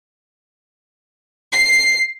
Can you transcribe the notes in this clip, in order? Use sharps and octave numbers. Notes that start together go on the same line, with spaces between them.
C7